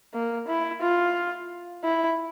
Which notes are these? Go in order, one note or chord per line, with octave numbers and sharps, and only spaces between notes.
A#3
E4
F4
E4